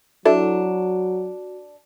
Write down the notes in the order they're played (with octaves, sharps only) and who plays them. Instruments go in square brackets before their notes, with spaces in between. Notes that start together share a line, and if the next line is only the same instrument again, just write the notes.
[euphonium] F#3 [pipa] D4 [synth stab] E4 A4 [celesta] F#4